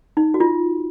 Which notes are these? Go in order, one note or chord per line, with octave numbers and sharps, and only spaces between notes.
D#4
F#4
F4